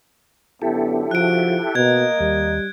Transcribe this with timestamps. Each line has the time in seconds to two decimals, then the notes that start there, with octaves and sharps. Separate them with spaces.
0.62 F#2 D3 B3 E4 G4 A4
1.11 C#3 F3 F#4 F#6 D7
1.75 B2 A#3 A#4 D#5 G#6
2.20 D#2 G3